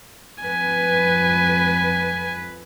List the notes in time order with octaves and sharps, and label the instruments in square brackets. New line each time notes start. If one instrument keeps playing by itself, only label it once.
[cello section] F2 B4 [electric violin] G#5